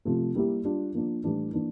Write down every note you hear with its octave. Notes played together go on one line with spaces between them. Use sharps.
C3 F3 A3
G3 A#3 E4 G4
G3 D4 F4
F3 A#3 D4
A2 E3 G3 D4
E3 A#3 D4